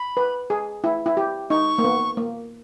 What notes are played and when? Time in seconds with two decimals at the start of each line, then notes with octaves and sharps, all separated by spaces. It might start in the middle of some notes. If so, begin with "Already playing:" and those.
Already playing: B5
0.17 B4
0.50 G#4
0.84 E4
1.06 E4
1.17 G4
1.50 D#4 C#6
1.78 A#3
1.84 B3
2.17 A#3